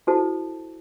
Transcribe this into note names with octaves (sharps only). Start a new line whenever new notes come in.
E4 F#4 A4 C5 A5